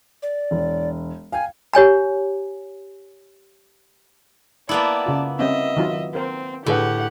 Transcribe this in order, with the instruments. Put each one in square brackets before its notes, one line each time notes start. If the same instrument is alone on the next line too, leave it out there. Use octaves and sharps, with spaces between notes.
[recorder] D5
[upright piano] E1
[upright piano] F5 G5 G#6 [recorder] G#5
[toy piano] G4 C#5 G#5 A#5
[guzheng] A#3 B3 E4 [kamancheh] D5 A5
[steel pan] C#3 F4
[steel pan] G3 C4 C#4 [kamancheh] D#5 E5
[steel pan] D#3 F#3 F4
[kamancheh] C4 [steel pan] A#4 C5
[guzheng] A2 [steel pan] D3 G#4 B4 [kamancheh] G4 F#5